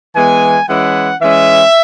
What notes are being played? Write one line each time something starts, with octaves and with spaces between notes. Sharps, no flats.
E3 G#3 B3 G#5
E3 G#3 C#4 E4 F#5
E3 G#3 C#4 E5